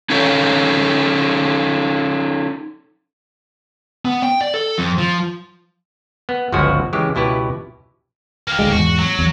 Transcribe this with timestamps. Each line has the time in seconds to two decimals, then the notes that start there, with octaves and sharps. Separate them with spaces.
0.10 C#4 D#4 F4 A4 C#5
4.05 B3
4.23 G5
4.41 D5
4.54 A4
4.78 F2
4.98 F3
6.29 B3
6.52 G1 C#2 F3 B3 F#4 G#5
6.93 C#3 E3 G#3 G4
7.15 C#2 B2 E4 G4 B4
8.48 A#3 G4
8.59 D#1 D2 G#3
8.71 E2 G#2 F#4
8.99 F#3
9.19 E2